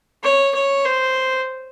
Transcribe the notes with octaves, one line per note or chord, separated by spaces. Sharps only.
C#5
C#5
C5